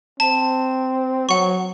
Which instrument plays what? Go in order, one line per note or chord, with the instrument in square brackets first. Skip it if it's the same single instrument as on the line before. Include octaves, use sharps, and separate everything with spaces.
[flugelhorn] C4 [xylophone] A5
[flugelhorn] F#3 [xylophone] F#5 C#6